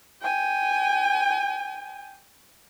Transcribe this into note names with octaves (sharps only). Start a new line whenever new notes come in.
G5 G#5